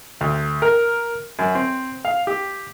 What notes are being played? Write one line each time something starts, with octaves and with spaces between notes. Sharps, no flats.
D2
A#4
F#2
C4
F5
G4